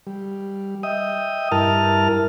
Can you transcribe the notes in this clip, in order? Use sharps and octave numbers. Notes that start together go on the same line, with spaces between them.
G3
D#5 E5 G5 D#6
G2 E4 A#4 A5 F6